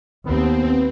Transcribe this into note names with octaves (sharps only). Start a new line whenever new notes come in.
D#2 B3 C4